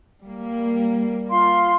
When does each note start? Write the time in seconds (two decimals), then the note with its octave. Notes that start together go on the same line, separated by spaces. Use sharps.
0.21 G3 A#3
1.30 F4 F5 C6